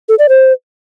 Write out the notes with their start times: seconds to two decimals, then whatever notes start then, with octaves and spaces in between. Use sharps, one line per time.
0.09 A4
0.19 D5
0.29 C5